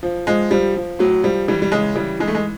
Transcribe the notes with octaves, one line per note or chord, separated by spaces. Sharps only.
F3
F3 G#3
F3 G3
F3
A2 F#3
F3 G3
E3 G3
G3
C#3 G#3
E3 G3
E3 G#3
A3
G#3